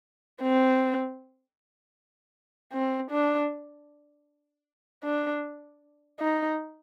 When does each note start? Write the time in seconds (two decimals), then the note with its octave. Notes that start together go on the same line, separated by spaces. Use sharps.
0.42 C4
2.73 C4
3.11 D4
5.04 D4
6.20 D#4